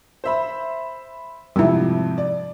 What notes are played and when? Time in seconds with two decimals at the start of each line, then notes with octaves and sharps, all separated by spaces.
0.24 C5 E5 B5
1.56 F2 G#2 C3 G3 C4 E4
2.18 D5